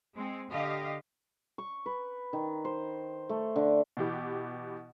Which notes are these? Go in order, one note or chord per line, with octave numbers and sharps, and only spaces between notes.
G#3 C4
D3 G4 D#5 F5
C#6
B4
D#3
C5
A3
D3
B2 E3 G4